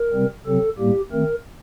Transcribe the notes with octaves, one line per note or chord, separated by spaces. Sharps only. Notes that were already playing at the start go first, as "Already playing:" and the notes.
Already playing: A#4
C3 G3 C4
C3 F#3 C4 A4
A2 G3 A#3 G4
D#3 A3 C4 A#4